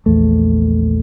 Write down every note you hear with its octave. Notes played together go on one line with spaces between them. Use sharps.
A#1 E2 A3